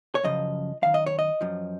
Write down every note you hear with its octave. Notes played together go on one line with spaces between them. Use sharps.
C#5
F#2 C#3 F3 D#5
F#2 D#3 F5
D#5
C#5
D#5
F#2 F3